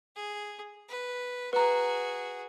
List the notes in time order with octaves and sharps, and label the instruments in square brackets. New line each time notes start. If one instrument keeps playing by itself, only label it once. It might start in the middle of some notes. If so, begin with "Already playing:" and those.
[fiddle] G#4
B4
[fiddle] F#4 G#4 [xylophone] B4 A#5